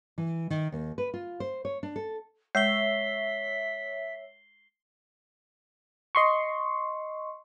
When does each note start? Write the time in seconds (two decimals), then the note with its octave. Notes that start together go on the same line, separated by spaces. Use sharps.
0.18 E3
0.50 D#3
0.72 D#2
0.98 B4
1.14 F4
1.40 C5
1.65 C#5
1.83 D4
1.96 A4
2.55 G#3 C#5 E5 B6 C7 G7
6.15 D#5 C6 C#6